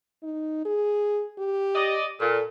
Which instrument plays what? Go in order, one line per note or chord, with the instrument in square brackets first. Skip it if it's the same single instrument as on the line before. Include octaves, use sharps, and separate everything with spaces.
[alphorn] D#4
G#4
G4
[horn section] D5 D#5
[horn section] A#2 [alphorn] A4